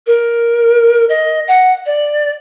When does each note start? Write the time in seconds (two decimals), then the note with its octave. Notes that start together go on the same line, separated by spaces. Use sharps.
0.06 A#4
1.09 D#5
1.48 F#5
1.86 D5